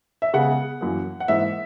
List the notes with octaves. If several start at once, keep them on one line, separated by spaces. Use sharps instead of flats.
E5
C#3 G#3 B3 F#5
F#2 E3 A#3
F#5
G#2 E3 A#3 E5